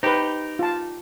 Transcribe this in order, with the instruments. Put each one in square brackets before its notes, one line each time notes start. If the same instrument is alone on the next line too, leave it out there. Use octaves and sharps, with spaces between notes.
[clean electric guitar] D#4 G4 [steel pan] B4 C5
[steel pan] F4 A5